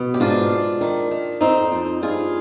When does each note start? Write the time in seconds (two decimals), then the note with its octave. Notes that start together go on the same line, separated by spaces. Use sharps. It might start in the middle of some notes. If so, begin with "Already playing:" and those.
Already playing: B2
0.14 G4
0.20 G#2 D4 F4
0.50 G#2
0.81 D#3
1.11 D#3
1.41 F2 C4 D#4
1.72 F2
2.02 G2 F4 G#4